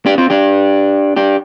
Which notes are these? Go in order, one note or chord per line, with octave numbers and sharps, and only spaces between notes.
D4 G4
C4 F4
D4 G4
D4 G4